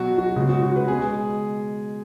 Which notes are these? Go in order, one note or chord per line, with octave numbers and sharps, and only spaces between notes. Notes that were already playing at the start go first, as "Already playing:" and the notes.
Already playing: B2 F#3 F#4
F#4
C#3 G#3
F#4
F#4
B4
B2 G#3 G#4